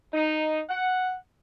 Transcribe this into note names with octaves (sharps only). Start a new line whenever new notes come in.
D#4
F#5